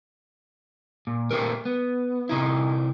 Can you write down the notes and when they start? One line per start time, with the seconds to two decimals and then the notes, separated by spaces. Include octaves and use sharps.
1.07 A#2
1.31 A#2 A3 A#3 C4 G4 A#4
1.65 B3
2.29 C3 D#4 E4